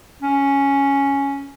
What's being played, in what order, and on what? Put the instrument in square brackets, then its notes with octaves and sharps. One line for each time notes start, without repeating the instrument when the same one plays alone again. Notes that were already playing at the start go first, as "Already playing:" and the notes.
[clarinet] C#4